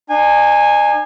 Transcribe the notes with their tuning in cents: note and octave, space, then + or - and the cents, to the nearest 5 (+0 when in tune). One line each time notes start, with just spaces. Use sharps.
D4 +45 G#5 -15